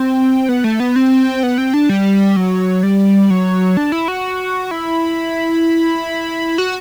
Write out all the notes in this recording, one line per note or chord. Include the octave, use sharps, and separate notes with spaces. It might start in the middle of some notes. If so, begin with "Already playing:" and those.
Already playing: C4
B3
A3
B3
C4
B3
C4
D4
G3
F#3
G3
F#3
D4
E4
F#4
E4
F#4